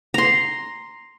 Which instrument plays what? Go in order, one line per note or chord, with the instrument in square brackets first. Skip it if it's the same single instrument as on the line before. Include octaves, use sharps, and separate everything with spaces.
[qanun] A#5 C6